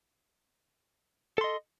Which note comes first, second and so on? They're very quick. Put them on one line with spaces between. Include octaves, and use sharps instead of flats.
A4 C6 D#5